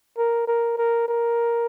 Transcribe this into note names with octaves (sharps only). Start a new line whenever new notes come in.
A#4
A#4
A#4
A#4